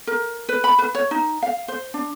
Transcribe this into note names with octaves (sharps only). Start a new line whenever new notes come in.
A#4
B4
B5
B4
C#5
D#4
F5
C5
D4